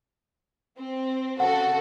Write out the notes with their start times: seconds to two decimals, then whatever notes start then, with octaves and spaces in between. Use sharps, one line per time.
0.77 C4
1.40 C#3 F#4 A4 F#5